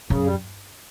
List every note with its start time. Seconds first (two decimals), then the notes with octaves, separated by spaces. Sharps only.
0.09 F#2 C#3
0.25 G3